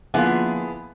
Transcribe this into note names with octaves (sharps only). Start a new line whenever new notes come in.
D3 F3 A#3 B3 E4 F4 G#4